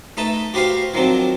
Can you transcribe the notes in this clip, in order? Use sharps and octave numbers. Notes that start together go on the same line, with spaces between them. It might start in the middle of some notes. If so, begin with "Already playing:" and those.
A3 D#4 B4 A5
F#4 G4 B4 C5 F5
D#3 F3 F#3 C4 D4